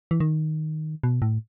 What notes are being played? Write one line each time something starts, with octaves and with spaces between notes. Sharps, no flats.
E3
D#3
B2
A2